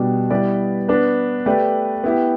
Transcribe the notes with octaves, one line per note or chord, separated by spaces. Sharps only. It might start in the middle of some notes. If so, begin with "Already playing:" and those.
Already playing: B2 G3 D4 G4
G3 B3 E4 B4 D5
B3 D4 B4
A3 G4 B4 D5
B3 E4 G4